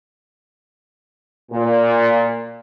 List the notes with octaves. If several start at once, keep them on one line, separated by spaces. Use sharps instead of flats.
A#2